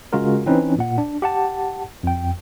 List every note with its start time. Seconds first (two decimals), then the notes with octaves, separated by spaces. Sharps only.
0.13 C#3 G#3 F4 F#4 A#4
0.46 E3 C4 C#4 D#4 B4
0.79 A#2 F#5
0.98 D4
1.22 G4 F#5 A5
2.03 F2 G5